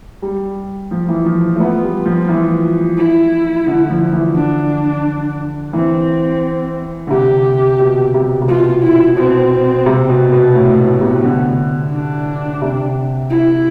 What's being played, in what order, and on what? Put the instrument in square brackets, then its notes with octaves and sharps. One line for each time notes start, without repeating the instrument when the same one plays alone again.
[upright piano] G3
F3
E3
F3
A3
[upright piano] B3 [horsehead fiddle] F4
[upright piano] G3
F3
E3
[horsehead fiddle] E4
[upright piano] D3
F3
E3
[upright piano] D3 [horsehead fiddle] D4
[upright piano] E3 [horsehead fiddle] C4
[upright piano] D3
[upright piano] C3 [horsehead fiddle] G4
[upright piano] B2
C3
C3
[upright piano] B2 [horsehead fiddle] F4
[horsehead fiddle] E4
[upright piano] B2 [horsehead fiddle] C4
[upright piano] C3
B2
B2
[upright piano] A2 [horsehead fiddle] B3
[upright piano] B2
C3
D3
[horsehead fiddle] D4
[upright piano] C3
[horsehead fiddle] E4